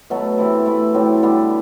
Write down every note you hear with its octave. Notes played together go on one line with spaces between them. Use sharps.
B2 F#3 A3
C3 E3 A3 E4
A3 E4 B4
A2 F#3 C4 G4
D3 G3 B3 D4